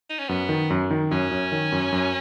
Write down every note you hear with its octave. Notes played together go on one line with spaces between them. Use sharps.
D#4
C#4
F#2 B3
D#3
F#2
D#3
F#2 C#4
F#2
D#3
F#2
F#2